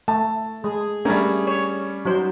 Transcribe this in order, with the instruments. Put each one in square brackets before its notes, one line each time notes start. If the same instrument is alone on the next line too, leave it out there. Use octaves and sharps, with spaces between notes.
[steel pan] A3 [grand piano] A5
[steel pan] G#3 [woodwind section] G#4
[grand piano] G3 C#4 [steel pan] A3 D4 A#4
[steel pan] C#5
F#3 D#4 C5